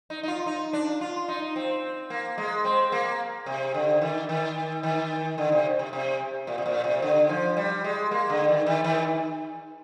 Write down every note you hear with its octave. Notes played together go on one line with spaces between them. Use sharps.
D#4
D#4
F4
D#4
D4
F4
D#4
C4
A#3
G#3
C4
A#3
C3
D3
D#3
D#3
D#3
D3
C3
C3
C3
A#2
C3
A#2
C3
D3
F3
G3
G#3
A#3
D3
D#3
D#3
D#3